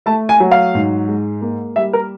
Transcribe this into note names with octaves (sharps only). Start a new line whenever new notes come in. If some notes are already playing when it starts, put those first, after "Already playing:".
A3 A5
G#5
F#3
F5
G#2
G#3
A#3
G3 E5
A#4